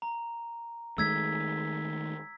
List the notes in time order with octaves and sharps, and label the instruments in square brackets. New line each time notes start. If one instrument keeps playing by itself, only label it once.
[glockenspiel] A#5
[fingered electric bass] D#3 G#3 A3 [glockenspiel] E6 G#6 B6